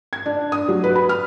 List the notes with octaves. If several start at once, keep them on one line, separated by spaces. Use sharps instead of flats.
G#6
D4
D#6
F#3
B4
B5
F6